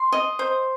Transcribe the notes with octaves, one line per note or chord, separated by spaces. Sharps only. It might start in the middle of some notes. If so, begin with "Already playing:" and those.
Already playing: C6
D#5
C5